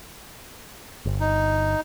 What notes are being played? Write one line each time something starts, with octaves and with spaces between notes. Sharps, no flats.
G1
D#4